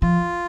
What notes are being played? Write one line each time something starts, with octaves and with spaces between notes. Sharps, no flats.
F3 F4